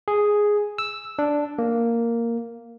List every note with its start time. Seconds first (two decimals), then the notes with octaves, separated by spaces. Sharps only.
0.08 G#4
0.78 E6
1.19 D4
1.59 A#3